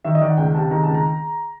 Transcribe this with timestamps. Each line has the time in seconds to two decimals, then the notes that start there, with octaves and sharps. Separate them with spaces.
0.04 D#3 E5
0.15 D#5
0.21 D#3 D5
0.30 F#5
0.37 C#2 G5
0.55 C3 A5
0.71 D#3 A#5
0.83 C#2 A5
0.95 A#5